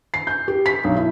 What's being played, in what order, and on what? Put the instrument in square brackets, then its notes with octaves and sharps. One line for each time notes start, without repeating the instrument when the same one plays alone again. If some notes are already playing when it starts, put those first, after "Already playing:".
[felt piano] C7
G6
G4
B6
B1
E4